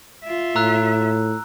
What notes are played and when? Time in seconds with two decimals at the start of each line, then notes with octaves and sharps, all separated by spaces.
0.24 F4 E5
0.56 A2 A#5 E6 F#6